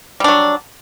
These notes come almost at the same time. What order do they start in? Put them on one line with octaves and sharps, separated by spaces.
G3 D4 F#3